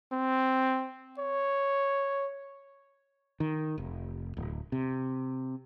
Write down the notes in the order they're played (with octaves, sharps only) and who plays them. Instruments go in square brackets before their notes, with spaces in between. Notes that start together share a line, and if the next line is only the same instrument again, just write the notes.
[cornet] C4
C#5
[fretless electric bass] D#3
F1
D1
C3